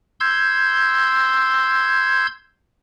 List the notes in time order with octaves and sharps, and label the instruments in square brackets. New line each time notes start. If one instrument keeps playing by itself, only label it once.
[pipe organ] C6 E6 G6 G#6